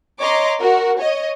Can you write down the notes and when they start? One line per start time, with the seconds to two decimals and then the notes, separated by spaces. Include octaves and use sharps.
0.20 C#5 D#5 A#5 C6 D6
0.60 F#4 A#4
0.99 C#5 D#5